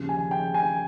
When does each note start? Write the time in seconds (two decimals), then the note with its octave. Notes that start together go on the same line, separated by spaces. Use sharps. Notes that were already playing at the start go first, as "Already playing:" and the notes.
Already playing: D#2 C#3 F3
0.09 G#5
0.31 G5
0.54 G#5